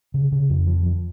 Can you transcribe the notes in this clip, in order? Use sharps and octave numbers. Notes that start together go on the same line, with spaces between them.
C#3
C#3
F2
F3
F3